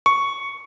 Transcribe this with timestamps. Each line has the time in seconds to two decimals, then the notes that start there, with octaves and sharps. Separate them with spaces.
0.06 C#6